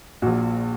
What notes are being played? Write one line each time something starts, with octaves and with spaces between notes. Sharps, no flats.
A#1 A#2 F#4